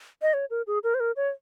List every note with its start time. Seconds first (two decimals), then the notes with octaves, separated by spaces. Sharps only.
0.22 D#5
0.34 C#5
0.50 A#4
0.67 G#4
0.84 A#4
0.94 C5
1.00 A#4
1.16 C#5